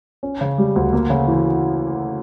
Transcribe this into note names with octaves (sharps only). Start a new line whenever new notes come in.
C#4
C#3
G3
D2
A#3
C#3
E3